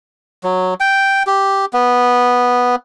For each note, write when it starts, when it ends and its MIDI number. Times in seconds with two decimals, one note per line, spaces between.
0.43 0.74 54
0.80 1.23 79
1.27 1.65 67
1.73 2.76 59